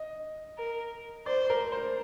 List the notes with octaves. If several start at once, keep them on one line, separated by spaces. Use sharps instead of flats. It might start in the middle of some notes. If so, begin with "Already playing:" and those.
Already playing: D#5
A#4
C5 D5
A#4
C5